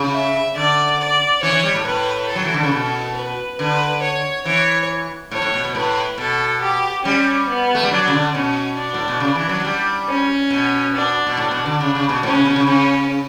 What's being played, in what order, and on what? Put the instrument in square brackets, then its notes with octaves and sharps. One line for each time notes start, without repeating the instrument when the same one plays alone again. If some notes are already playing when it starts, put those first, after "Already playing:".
Already playing: [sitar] C#3
[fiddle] E5
[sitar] D3 [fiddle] D5
[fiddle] D5
[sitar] E3 [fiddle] C#5
[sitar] E3
G3
A2
[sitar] A2 [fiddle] B4
[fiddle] A4
[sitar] F#3
E3
D3
C#3
B2
[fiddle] B4
[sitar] D3 [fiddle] B4
[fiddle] C#5
[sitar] E3 [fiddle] C#5
[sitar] A2 [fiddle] C#5
[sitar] A2
B2
B2
[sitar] A2 [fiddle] B4
[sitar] B2 [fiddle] A4
[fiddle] G4
[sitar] G3 [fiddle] C#4
[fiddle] B3
[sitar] A3
G3
[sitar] F#3 [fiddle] D4
[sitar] C#3
D3
[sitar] B2 [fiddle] C#4
[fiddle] D4
[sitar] A2
B2
C#3
E3
F#3
F#3
G3
[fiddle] C#4
[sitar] B2
[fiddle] D4
[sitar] B2
[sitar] A2 [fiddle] D4
[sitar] B2
D3
C#3
C#3
B2
[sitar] A2 [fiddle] C#4
[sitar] C#3
B2
C#3
[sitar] C#3 [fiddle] C#4